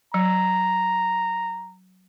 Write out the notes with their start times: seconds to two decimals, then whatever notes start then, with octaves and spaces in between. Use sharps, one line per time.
0.14 F#3 A#5